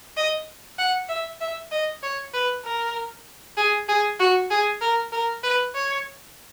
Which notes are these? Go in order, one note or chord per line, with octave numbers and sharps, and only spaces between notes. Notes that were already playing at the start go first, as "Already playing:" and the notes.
D#5
F#5
E5
E5
D#5
C#5
B4
A#4
G#4
G#4
F#4
G#4
A#4
A#4
B4
C#5